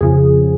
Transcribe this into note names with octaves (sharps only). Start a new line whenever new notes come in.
F2 C#3 F3 G#4